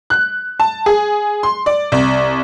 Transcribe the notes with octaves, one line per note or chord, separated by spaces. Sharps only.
F#6
A5
G#4
C6
D5
C2